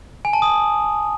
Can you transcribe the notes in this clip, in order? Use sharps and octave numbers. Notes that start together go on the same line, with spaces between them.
G#5
A5
D#6